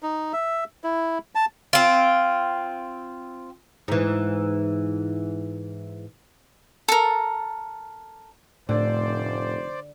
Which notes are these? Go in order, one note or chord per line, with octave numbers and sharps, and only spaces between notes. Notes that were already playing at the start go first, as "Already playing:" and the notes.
D#4
E5
E4
A5
C4 F4
G#2 E3
A4 A#4
F1 A2 D3 C5 D5